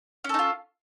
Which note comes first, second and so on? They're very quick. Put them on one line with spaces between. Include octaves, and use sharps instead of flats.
C#4 A4 D#4 F4